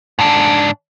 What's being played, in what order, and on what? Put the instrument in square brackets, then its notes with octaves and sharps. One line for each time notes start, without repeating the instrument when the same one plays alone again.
[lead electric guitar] G#2 D4